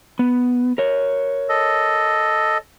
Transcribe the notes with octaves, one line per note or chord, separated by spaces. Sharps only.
B3
A#4 C#5
A4 D#5